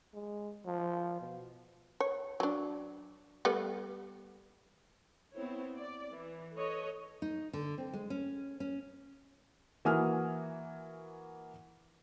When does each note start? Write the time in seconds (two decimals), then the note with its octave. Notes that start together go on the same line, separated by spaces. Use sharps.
0.14 G#3
0.66 F3
1.21 B2
2.00 C#5
2.40 F#3 D4
3.45 G3 A3 B3
5.35 B3 C4 E4 C5 C#5
5.78 D5
6.13 E3
6.54 A4 B4 C#5 D#5
7.22 D#4
7.53 D3
7.78 C4
7.94 G#3
8.10 C#4
8.60 C#4
9.85 E3 A#3 F#4 G#5 D#6 F6